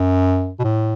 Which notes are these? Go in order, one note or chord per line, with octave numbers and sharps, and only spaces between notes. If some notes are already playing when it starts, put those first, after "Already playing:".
Already playing: F#2
B2
A2